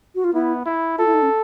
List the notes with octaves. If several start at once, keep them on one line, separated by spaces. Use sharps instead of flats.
F#4
F4
B3 E4
E4
F4 A4
E4
D#4
C#4